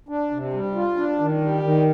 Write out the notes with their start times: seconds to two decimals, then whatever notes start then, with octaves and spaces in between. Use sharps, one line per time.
0.09 D4
0.31 C3
0.53 G3
0.75 F4
0.97 D4
1.19 D#3
1.41 G3
1.63 D#3